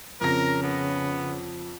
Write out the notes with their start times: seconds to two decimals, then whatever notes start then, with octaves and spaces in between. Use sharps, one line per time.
0.21 F2 C#3 A#4 A#6
0.63 B3